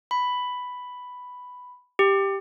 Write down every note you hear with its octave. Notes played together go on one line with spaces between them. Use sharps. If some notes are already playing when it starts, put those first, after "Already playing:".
B5
G4